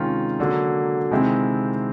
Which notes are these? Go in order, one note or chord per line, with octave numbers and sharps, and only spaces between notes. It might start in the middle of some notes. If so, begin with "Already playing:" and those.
Already playing: C3 D#3 G#3 C#4 F4
D3 F#3 A#3 D4
C3 D#3 G#3 C4 E4